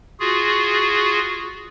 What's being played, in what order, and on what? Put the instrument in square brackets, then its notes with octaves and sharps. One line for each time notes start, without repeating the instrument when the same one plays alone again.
[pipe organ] F4 F#4 G#4